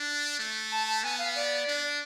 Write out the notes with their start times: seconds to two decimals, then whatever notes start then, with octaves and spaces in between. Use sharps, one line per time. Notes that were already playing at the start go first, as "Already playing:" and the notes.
Already playing: D4
0.39 A3
0.72 A5
0.87 A5
1.03 B3 G#5
1.19 F5
1.35 D5
1.67 D4